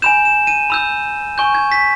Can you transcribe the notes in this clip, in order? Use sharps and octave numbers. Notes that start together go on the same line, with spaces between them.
G#5 B5 G6 E7
E7
D#7
B5 E6 G6
G#5 C#6 G6
G#6
B6